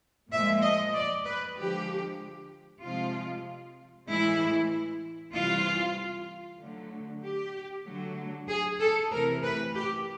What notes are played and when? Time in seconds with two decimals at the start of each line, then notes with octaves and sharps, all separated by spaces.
0.31 A#2 F3 G#3 E5
0.63 D#5
0.95 D5
1.25 B4
1.57 D3 F3 G#3 G4
2.83 C3 F3 G#3 F4
4.09 A2 E3 G#3 E4
5.34 C3 E3 G3 F4
6.60 D3 F#3 A3
7.23 G4
7.85 D3 F#3 A3
8.49 G#4
8.80 A4
9.12 C3 E3 A3 A#4
9.43 B4
9.75 G4